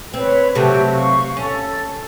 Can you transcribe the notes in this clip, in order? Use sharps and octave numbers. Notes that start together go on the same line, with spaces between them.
C4 B4 C#5
C3 F#3 A3 G4 C#6
F5 C#6
C#4 A4